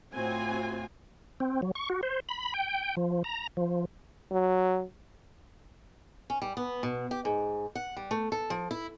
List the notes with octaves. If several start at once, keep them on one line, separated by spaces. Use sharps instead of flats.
A2 C4 F4 F#4 G#5
C4
F#3
C#6
F#4
C5
B5
G5
F3
A#5
F3
F#3
C#4
G3
B3
B2
G4
G#2
F#5
G3
A3
A4
F3
E4